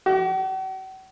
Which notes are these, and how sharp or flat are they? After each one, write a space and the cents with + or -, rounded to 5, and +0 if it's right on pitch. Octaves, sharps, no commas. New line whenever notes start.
F#4 +45